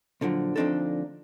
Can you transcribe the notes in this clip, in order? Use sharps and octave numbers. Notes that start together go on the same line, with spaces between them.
A#2 D3 F3 F#3
D2 F3 C4 D4 D#4 A4